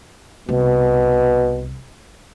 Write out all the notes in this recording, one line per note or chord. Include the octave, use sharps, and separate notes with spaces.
C2 B2